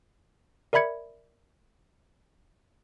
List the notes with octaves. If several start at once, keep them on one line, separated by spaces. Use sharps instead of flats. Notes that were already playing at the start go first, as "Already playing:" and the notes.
A#4 D5 E5 B5 G#6 C#7